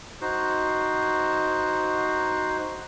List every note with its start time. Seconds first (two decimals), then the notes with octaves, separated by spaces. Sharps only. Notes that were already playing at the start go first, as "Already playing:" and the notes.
0.21 D#4 F#4 C5